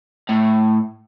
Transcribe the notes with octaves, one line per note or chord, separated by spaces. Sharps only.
A2